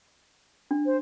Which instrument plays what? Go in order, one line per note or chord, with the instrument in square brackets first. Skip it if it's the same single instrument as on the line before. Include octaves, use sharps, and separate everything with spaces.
[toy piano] D4
[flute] C5